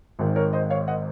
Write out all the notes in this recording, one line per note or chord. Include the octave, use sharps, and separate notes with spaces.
G#1 G#2 D#3
A#4 C#5
C5 D#5
C#5 F5
D#5 F#5